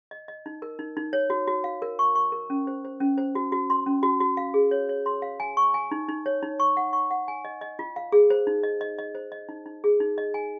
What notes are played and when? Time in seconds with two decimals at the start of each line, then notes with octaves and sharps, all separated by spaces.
0.11 D#5
0.28 D#5
0.46 D#4
0.62 A#4
0.79 D#4
0.97 D#4
1.13 C#5
1.30 F#4
1.47 F#4
1.64 F5
1.82 A#4
1.99 C#6
2.15 C#6
2.32 A#4
2.50 C#4
2.67 C5
2.85 C5
3.00 C#4
3.18 C5
3.35 F#4
3.52 F#4
3.70 C6
3.86 C#4
4.03 F#4
4.20 F#4
4.37 F5
4.54 G#4
4.71 C#5
4.89 C#5
5.06 C6
5.22 F5
5.40 G#5
5.57 C#6
5.74 G#5
5.91 D#4
6.09 D#4
6.26 C#5
6.43 D#4
6.60 C#6
6.77 F#5
6.93 C#6
7.11 F#5
7.28 G#5
7.45 D#5
7.61 D#5
7.79 F4
7.96 F5
8.12 G#4
8.30 C5
8.47 D#4
8.63 D#5
8.81 D#5
8.98 D#5
9.15 C5
9.32 D#5
9.49 D#4
9.66 D#4
9.84 G#4
10.00 D#4
10.18 D#5
10.34 G#5